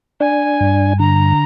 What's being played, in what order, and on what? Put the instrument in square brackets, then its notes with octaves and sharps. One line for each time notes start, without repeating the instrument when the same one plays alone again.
[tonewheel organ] D4 [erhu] G#5
[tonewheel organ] G2
[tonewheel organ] D3 [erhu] A#5